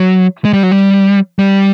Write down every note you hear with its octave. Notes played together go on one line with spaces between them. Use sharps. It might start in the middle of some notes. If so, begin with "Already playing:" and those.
Already playing: F#3
G#3
G3
F#3
G3
G3